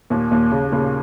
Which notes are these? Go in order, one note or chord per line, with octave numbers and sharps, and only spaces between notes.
D#2 A#2
D#2 A#2
C#3
A#2 C#3